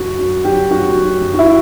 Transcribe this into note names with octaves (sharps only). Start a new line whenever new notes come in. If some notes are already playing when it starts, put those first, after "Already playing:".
Already playing: F#2 F#3 F#4
F#2
F#3 G4
F#2 F#4
F#3
F#2
F#4
E4